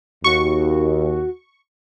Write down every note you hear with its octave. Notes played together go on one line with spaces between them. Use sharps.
D#2 F#4 C#6